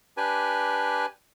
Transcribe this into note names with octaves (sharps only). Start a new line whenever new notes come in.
D4 G4 B4 G#5